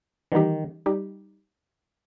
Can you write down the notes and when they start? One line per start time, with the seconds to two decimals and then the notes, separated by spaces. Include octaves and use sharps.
0.32 D#3 E3 G3 B3 D#4 G4
0.86 G3 D#4 G4